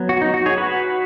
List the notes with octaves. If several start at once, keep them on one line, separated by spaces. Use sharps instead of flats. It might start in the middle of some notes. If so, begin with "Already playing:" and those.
Already playing: F#3 B3
F#4
D#4
F#4
G#4 C#5
F#4 B4